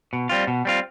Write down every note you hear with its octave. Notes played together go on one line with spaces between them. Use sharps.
B2
G3 C4 F4
B2
G3 C4 F4